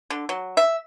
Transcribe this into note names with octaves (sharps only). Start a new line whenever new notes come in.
D3
F#3
E5